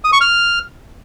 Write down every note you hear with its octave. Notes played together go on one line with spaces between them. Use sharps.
D#6
C#6
F6